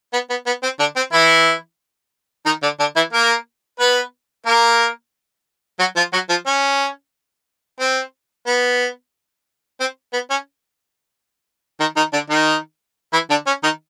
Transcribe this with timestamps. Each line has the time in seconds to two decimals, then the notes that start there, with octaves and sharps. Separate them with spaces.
0.13 B3
0.30 B3
0.46 B3
0.63 C4
0.79 D3 D4
0.96 C4
1.13 E3 E4
2.46 D#3 D#4
2.63 D3 D4
2.80 D3 D4
2.96 E3 E4
3.13 A#3 A#4
3.80 B3 B4
4.46 A#3 A#4
5.79 F#3 F#4
5.96 F3 F4
6.13 F#3 F#4
6.30 F3 F4
6.46 C#4
7.80 C4
8.46 B3
9.80 C4
10.13 B3
10.30 C#4
11.80 D#3 D#4
11.96 D#3 D#4
12.13 D3 D4
12.30 D#3 D#4
13.13 E3 E4
13.30 D3 D4
13.47 C#4
13.63 D#3 D#4